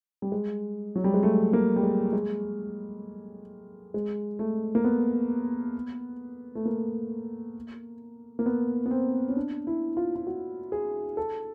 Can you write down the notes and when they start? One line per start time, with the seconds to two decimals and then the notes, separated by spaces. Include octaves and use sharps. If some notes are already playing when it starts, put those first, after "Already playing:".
0.22 G3
0.32 G#3
0.95 F#3
1.04 G3
1.14 G#3
1.23 A3
1.53 A#3
1.76 G3
1.83 G#3
2.13 G#3
3.94 G#3
4.39 A3
4.75 A#3
4.84 B3
6.55 A3
6.65 A#3
8.39 A#3
8.46 B3
8.86 B3
8.91 C4
9.29 C#4
9.36 D4
9.67 E4
9.97 F4
10.16 F4
10.27 F#4
10.72 G#4
11.17 A4